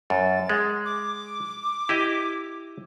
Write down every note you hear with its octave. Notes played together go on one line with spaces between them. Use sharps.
F#2 A6
G#3
D6
E4 G4 D#5